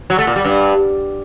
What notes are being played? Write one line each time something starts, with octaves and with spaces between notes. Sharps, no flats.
F#3
A3
A#2
G3
G2